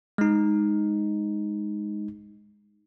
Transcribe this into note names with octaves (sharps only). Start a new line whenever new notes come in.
G#3 D#4